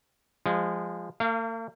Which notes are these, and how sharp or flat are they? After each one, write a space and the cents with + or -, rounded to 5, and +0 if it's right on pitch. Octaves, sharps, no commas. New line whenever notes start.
F3 +0 G#3 -20
A#3 -45 F5 -15